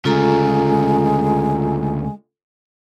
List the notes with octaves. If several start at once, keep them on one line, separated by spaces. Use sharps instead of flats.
D2 C#3 G#3 F4 A4 A#5